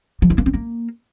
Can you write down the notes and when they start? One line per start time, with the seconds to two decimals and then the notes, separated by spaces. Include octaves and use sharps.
0.22 F3
0.30 E4
0.38 A#3
0.46 C4
0.54 A#3